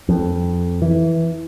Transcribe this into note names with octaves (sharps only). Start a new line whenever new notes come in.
F2
E3